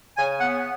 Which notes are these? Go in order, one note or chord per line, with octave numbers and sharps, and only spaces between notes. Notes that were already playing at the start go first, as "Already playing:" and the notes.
C#3 G#5
B3 F#5